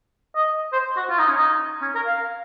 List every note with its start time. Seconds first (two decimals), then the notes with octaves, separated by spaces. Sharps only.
0.36 D#5
0.73 C5
0.97 F#4
1.09 F4
1.19 D#4
1.28 C#4
1.37 D#4
1.82 C#4
1.95 A#4
2.06 F5